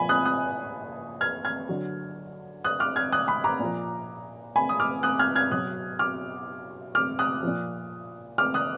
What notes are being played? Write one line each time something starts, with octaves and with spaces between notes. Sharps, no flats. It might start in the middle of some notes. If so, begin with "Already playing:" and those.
Already playing: A#2 F3 G#5 B5
D#6 F#6
D#6 F#6
F6 G#6
F6 G#6
D3 F#3
D#6 F#6
D6 F6
F6 G#6
D#6 F#6
B5 D#6
A#5 D6
A#2 F3
G#5 B5
D#6
D6 F6
D#6 F#6
F6 G#6
F6 G#6
B2 F#3 D#6 F#6
D6 F6
D6 F6
D#6 F#6
A#2 F3
D6 F6
D#6 F#6